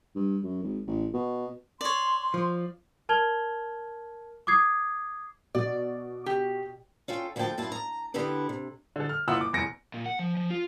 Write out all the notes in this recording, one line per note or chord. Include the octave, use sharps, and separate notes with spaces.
G2
F#2
G#1
A1
B2
C#5 D5 C6
F3
A#4 A5 F6 G#6 F7 G7
D6 D#6 G#6 C7
B2 D5
G4
C#4 F4 A4 G5
D2 F3 A4 F#5 G5 A5
F#2 E4 F4 A5
A#5
D3 B3 E4 G4 A4 B4
C3
D3 A4
F6
F#1 E4 F4 F#5 E6
D6
F1 E2 A#6 C#7 D7
A#2
F#5
F3
F3
F4